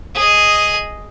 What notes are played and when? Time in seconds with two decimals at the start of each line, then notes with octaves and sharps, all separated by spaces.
0.15 G#4 D#5